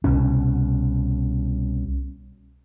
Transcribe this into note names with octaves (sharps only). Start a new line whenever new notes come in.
C2 B2 C#4